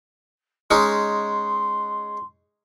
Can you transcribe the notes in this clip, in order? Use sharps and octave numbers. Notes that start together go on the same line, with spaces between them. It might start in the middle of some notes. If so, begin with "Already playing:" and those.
G#3 C#4 D#4 C6